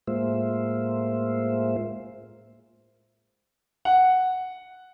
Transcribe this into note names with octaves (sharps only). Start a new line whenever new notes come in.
A2 G#3 A#3 F4 C5 E5
F#5